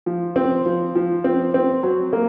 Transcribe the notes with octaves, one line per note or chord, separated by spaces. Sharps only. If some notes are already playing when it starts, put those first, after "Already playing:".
F3
C4
F3
F3
C4
C4
F#3
A#3